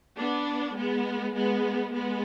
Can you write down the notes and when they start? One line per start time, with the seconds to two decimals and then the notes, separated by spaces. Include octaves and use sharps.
0.18 B3 D4
0.77 G#3 B3
1.35 G#3 B3
1.94 G#3 B3